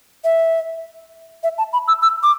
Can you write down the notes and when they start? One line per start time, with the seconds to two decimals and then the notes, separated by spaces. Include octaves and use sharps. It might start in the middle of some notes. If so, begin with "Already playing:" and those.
0.24 E5
1.43 E5
1.58 A5
1.73 B5
1.88 E6
2.02 E6
2.23 D6